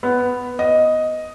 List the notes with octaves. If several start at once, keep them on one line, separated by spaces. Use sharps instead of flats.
B3
D#5